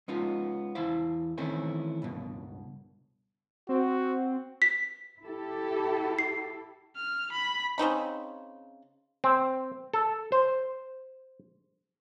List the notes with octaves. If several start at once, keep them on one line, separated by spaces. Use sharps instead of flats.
G#3 B3 C#4 D#4 F4
E2 E4 C5 F5
D#3 E3 A3 C4 C#4 E4
C#2 G2 B2
C4 F#4
B6
E4 G4 A4
C7
F6
B5
C#3 C4 D#4 B5
C4
A4
C5